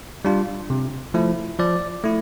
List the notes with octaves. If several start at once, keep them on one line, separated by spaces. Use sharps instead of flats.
G3 D4 F4
C3
F3 A3 E4
F3 D5
A3 E4